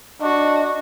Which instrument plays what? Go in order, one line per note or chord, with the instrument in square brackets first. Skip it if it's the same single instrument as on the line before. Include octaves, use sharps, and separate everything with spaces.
[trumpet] D4 [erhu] F#4 [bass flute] D#5